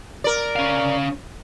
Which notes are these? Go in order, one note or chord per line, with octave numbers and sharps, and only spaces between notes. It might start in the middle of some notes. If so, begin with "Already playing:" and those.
A#4 D5
C#4 F5